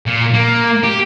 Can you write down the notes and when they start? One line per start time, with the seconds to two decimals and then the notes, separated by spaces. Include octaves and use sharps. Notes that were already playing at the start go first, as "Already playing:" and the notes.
0.06 A#2
0.34 A#3
0.83 G4